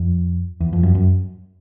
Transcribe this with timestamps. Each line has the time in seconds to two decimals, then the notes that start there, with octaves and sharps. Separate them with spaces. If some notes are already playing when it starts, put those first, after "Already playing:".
Already playing: F2
0.61 E2
0.73 F2
0.83 F#2
0.95 F#2